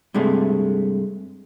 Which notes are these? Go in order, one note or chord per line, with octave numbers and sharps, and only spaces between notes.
G2 C3 G#3 A3